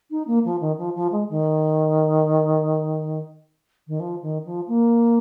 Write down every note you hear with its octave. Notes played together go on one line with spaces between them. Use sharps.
D#4
A#3
F3
D#3
F3
F3
G#3
D#3
D#3
F3
D#3
F3
A#3